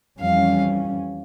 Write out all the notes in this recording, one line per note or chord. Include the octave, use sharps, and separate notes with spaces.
F2 E3 G3 C#4 F5